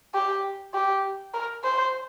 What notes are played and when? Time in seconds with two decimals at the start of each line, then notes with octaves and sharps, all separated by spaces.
0.14 G4
0.74 G4
1.34 A#4
1.64 C5